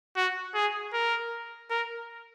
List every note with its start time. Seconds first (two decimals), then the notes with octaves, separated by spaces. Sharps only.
0.16 F#4
0.54 G#4
0.93 A#4
1.70 A#4